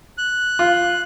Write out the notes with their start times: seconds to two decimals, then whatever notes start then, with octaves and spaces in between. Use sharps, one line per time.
0.18 F#6
0.59 F4